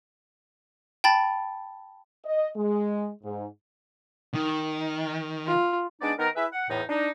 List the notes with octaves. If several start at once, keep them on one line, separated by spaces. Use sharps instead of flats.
G5 A5 B5 A6
D#5
G#3
G#2
D#3
F4
G#3 B3 D4 D#4 D5
D#3 B3 D#4 A#4
E4 G#4 B4 E5
F#5
E2 A2 D#4
D4 D#4